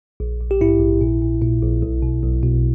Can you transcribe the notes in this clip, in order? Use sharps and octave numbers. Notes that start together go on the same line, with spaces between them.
A#1
A#1
G4
G#2 E4
A#1
A#2
A#2
A#2
A#1
B1
B2
B1
B2